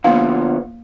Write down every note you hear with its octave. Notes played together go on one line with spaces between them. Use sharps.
D3 F3 A#3 B3 F5